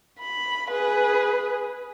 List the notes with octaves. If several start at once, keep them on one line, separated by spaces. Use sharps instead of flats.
B5
G#4 B4